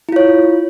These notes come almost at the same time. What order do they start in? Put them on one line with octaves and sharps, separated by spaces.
E4 F4 C#5